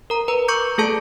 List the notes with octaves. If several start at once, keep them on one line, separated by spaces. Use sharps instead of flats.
A#4 A#5
B4 A#5
C#6 D6 G6 C#7
A3 G#4 A4 A5 G6